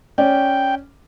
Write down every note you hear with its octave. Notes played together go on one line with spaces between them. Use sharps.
C#4 D5 G5